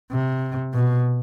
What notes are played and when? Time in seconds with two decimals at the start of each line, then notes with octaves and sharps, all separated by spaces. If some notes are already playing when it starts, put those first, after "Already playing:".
0.11 C3
0.74 B2